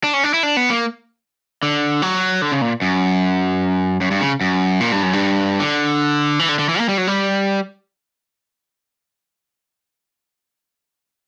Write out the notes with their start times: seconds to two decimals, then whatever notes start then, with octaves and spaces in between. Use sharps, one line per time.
0.04 D4
0.14 C#4
0.23 D4
0.34 E4
0.43 D4
0.57 B3
0.70 A#3
1.63 D3
2.02 F#3
2.42 D3
2.52 C#3
2.61 A#2
2.82 F#2
4.01 F#2
4.11 G2
4.21 C#3
4.41 F#2
4.80 A#2
4.92 G2
5.03 F#2
5.13 G2
5.60 D3
6.39 E3
6.49 D3
6.59 D3
6.69 E3
6.79 A#3
6.89 G3
6.98 F#3
7.07 G3